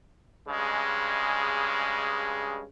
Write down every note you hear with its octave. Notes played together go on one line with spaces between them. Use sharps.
G2 C#3 G#3